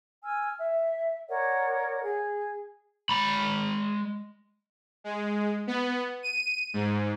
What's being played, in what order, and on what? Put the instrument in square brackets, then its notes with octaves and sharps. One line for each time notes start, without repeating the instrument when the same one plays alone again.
[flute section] G#5 E6 F6
E5
A#4 C#5 D5 F#5
G#4
[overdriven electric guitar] G#3 B5
[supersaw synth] G#3
B3
D#7
G#2